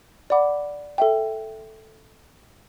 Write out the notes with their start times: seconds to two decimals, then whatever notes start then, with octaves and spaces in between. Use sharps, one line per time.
0.30 D5 F#5 B5 D6
0.98 A4 E5 G5